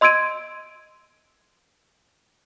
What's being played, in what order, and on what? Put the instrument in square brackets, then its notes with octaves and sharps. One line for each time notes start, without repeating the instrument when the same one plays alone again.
[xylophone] D#5 C6 E6 G#6 D7 D#7